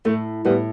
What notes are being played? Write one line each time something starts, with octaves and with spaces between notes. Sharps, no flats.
A2 A3
A2 G3 B3